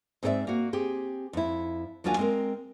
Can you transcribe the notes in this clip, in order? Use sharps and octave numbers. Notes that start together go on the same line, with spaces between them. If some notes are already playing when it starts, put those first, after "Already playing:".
G#2 C4 F#4 A4 D5 E5
A#3 F#4
C4 G4 G#4
F2 E4
D#2 F#3 D4 F4 F#4 G#5
G#3 C4 A#4